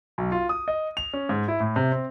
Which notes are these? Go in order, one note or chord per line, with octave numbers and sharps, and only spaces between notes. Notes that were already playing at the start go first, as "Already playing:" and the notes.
B1
F4
D#6
D#5
F7
C#4
G#2
E4
A2
C3
C4